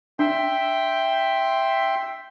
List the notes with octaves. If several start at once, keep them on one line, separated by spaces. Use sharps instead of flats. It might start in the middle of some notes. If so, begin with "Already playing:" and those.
D4 E5 G5 C6